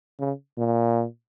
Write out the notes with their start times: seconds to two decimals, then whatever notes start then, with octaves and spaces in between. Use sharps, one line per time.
0.20 C#3
0.58 A#2